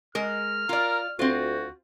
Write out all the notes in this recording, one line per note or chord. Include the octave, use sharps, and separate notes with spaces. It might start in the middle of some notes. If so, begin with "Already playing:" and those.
G#3 A#4 F6
F4 A#4 D5
D2 C4 F4 F#4